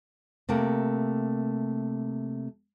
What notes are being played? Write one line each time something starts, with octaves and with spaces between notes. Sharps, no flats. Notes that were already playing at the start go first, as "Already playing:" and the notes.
C3 A3 A#3 A#4